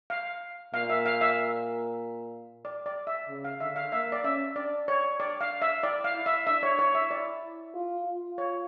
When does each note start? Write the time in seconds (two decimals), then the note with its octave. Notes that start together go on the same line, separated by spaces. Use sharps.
0.10 F5
0.74 A#2 F5
0.90 E5
1.06 F5
1.21 E5
2.65 D5
2.86 D5
3.07 E5
3.28 C#3
3.44 F5
3.60 D3 E5
3.76 F5
3.92 A#3 E5
4.12 D5
4.24 C#4 E5
4.56 D4 D5
4.88 C#5
5.20 D5
5.41 F5
5.62 E5
5.83 E4 D5
6.04 F5
6.15 E4
6.26 E5
6.47 D4 E5
6.63 C#5
6.79 E4 C#5
6.95 E5
7.11 E4 D5
7.74 F4
8.06 F4
8.38 C#5